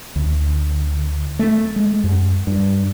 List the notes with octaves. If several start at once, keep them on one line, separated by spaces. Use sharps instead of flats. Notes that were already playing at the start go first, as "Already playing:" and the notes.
D2
A3
G#3
F#2
G2